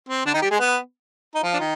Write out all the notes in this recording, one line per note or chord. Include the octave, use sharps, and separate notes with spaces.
C4
D3 D4
D#3 D#4
G3 G4
G#3 G#4
B3 B4
D#4
F3 F4
D4
D#3 D#4